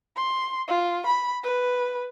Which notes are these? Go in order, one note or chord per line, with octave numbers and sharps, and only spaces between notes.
C6
F4
B5
B4